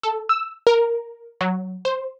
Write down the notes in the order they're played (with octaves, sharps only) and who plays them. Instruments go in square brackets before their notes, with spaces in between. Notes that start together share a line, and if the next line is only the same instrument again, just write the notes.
[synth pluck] A4
E6
A#4
F#3
C5